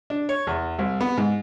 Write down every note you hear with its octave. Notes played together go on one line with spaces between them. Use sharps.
D4
C#5
E2
C2
B3
G#2